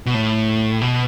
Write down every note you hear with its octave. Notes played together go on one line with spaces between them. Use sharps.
B2
A2
B2